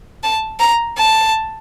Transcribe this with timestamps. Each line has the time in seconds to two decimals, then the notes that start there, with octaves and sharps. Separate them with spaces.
0.23 A5
0.60 A#5
0.98 A5